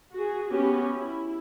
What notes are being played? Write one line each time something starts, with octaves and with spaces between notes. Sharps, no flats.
F#4 G#4
B3 C#4 F#4 G4
E4